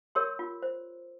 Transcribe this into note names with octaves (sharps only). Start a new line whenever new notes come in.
G4 A#4 C#5 C6 E6
F4
C5